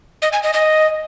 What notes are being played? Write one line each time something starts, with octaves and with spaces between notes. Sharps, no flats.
D#5
G#5
D#5
D#5